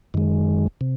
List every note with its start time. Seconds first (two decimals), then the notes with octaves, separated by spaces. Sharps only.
0.14 F#2 D#3 G#3
0.81 C3